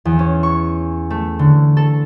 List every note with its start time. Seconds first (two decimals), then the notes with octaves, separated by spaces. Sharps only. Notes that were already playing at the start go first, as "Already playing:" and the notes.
0.05 E2
0.19 C#4
0.43 C#6
1.10 A3
1.39 D3
1.77 A4